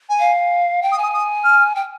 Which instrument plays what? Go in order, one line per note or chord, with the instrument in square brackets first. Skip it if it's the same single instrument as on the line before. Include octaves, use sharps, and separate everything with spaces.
[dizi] G#5
[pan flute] F5
G5
[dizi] D#6
[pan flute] G#5
[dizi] D#6
D#6
F6
[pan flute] G5